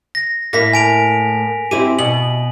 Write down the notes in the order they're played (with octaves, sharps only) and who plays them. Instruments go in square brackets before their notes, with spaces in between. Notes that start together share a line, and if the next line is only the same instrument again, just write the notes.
[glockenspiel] A#6
[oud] A2 A#3 E4 [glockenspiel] A#6 B6
[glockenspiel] G#5 D7 F7
[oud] C4 E4 G4 [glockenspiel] D#7
[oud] B2 [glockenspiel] F#7